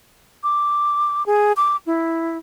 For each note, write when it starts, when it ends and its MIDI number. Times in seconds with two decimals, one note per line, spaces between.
0.43 1.25 86
1.26 1.52 68
1.57 1.76 86
1.86 2.38 64